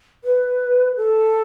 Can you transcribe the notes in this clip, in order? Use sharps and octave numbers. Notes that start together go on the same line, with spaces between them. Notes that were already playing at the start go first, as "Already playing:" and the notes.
B4
A4